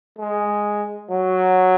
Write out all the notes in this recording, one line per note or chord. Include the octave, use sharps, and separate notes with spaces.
G#3
F#3